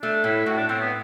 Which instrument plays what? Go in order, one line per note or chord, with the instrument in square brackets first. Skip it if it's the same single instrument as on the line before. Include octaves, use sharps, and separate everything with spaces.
[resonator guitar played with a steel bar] A3 [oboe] D4
[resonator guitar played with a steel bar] A2 [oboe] E4
[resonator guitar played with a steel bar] A2 [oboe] F#4
[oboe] D4
[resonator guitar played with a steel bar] A2 [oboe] C4
[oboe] B3